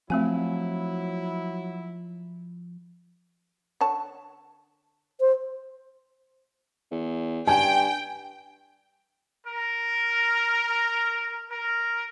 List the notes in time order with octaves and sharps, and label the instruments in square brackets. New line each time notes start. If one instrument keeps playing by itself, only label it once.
[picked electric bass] F3 [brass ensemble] F#3 E4 [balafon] A3 C4 G#5
[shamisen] D3 C#5 A5
[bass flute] C5
[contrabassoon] E2
[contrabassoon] G2 [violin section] G5 [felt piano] G#5
[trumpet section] A#4
A#4